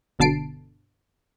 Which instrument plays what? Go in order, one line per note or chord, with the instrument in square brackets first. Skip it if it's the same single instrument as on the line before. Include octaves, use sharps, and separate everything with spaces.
[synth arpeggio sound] G1 B2 D3 A5 C7 D7